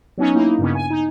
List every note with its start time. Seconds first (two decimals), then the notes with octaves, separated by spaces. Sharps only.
0.18 F#3 B3 C#4 D#4
0.35 A#3 D#4 E4
0.59 G2 C#3 B3
0.75 G#5
0.90 D#4